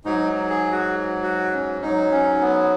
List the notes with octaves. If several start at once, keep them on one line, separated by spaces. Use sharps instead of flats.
G#2 F#3 D#4
G#4
F#4
F#4
C#4
G#2 F#3 D#4
C#4
B3